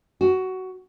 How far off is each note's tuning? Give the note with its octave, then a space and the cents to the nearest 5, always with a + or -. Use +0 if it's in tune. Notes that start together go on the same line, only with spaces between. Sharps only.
F#4 +15